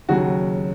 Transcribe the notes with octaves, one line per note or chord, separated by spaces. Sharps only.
D#2 C#3 F#3 F#4